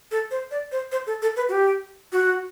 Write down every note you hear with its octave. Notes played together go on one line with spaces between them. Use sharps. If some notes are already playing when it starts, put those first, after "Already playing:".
A4
C5
D5
C5
C5
A4
A4
B4
F#4
G4
F#4